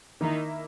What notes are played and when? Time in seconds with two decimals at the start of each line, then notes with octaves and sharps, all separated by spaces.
0.21 D#3 A#3 D#4 E4 A#4 E5